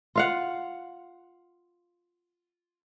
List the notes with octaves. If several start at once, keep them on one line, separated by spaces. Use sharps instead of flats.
F4 F5 F#5